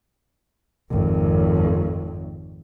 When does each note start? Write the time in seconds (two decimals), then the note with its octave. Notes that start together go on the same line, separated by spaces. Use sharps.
0.90 G#1 F2